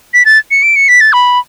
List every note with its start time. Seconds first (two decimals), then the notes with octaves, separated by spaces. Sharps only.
0.14 B6
0.25 A6
0.51 C#7
0.63 D7
0.76 C#7
0.88 B6
1.01 A6
1.13 B5